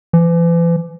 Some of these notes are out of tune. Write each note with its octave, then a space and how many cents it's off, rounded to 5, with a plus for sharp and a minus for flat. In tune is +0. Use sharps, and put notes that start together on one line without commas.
E3 +40